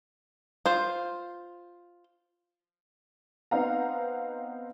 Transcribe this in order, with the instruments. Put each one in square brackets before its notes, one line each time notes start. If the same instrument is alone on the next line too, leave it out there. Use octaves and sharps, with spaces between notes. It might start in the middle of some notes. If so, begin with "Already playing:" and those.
[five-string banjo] F4 C5
[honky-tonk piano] B3 C4 D#4 F5 F#5 A#5